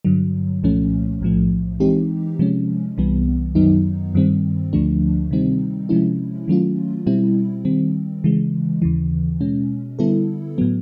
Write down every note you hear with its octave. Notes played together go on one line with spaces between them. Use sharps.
G2 D3 F#3
C2 A#2 F3 A3 C#4
B1 A2 F3 A3
E3 G#3 C4 D#4 G4
C3 F3 G#3 C#4
C2 C3 E3 G3 B3
F#2 D#3 F#3 B3 D#4
G2 D#3 G3 C4
D2 D3 F3 A3 D4
C3 D#3 G3 C4 D#4
C3 F3 G#3 C#4 E4
D#3 F#3 A3 C#4 F4
B2 G3 C4 E4
D#3 G3 C4
C#3 E3 G#3
D#2 C#3 E3
B2 G#3 C#4
D3 G3 B3 E4 A4
A2 F#3 B3